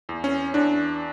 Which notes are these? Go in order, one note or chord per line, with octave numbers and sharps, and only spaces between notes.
E2
C#4
E2 D4